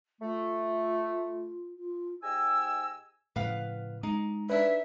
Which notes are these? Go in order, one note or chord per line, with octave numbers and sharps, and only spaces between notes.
A3 F4
F4
G#2 G4 D#5 G#5 E6
A2 C#3 F3 B4 F5 F#5
G#3 D#4
D4 B4 E5